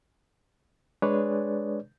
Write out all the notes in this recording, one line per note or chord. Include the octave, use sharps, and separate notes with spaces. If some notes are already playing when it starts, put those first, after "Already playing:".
G#3 D4 G#4 B4 C#5 D5